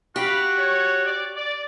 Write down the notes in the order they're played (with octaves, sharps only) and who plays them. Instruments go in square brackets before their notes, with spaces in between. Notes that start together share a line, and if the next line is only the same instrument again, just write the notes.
[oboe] F#4 [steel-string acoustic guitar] G4 [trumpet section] F5 B5
[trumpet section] C#5
D5
D5